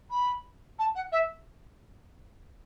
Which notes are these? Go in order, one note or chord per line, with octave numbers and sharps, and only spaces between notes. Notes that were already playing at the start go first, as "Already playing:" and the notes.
B5
A5
F#5
E5